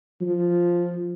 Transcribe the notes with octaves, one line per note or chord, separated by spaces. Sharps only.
F3